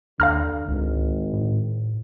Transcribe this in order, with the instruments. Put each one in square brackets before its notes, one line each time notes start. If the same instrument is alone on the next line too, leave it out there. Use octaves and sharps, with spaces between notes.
[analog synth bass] D#2 [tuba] D3 [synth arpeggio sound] F5 A#5 F6
[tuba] G#1 [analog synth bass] C#2
[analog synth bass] A2